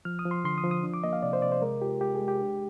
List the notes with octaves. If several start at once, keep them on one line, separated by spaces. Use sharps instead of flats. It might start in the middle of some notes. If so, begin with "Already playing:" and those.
F3 F6
D#6
F3
C6
D3 C6
D#6
F3
D#6
D4
D6
A#3 D#5
F5
C3 D5
C5
C3 D5
C5
G#3 A#4
F4 G4
G#3 G4
G#4
G#3
G4
D4